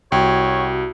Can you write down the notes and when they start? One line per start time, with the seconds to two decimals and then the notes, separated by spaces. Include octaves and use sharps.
0.12 C2 F#4 C#5 G5